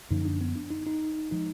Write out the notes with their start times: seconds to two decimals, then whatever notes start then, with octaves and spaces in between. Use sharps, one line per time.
0.11 F#2 D3 F3 A#3 D#4
0.25 D4
0.41 B3
0.56 D4
0.71 D#4
0.86 D#4
1.31 F3 G#3 D#4